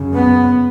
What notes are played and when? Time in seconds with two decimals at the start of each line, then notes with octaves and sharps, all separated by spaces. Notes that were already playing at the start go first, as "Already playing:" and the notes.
Already playing: F#2 C#3
0.13 B3